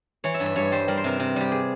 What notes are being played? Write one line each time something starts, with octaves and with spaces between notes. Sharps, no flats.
E3 C#5
E5
G2
E5
G2 C#5
G3 C5
G3 A#4
C5
C3 A#4
C3
G3 G4
G#4